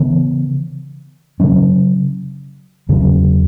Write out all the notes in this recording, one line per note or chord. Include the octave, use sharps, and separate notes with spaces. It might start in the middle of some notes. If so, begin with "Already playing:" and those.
Already playing: C#3 E3 B3
C#3 F#3 C#4
E2 C#3 F#3 C#4